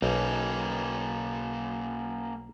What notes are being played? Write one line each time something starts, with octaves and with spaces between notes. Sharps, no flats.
B1 A#3 C#4